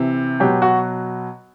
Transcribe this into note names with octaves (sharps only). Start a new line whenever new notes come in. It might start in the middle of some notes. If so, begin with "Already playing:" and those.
Already playing: C3 E3
B2 F#3 G4
F#4